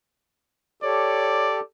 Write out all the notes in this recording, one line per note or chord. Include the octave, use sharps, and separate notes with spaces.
G4 A4 C#5 D5